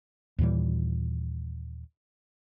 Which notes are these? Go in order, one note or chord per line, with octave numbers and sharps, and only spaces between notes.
D#2 A#2 E3 G3